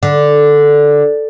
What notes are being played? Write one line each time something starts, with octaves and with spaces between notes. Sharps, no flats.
D3